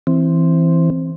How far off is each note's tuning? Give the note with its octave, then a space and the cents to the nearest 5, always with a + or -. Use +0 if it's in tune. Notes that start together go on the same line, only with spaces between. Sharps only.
E3 +0 C4 +0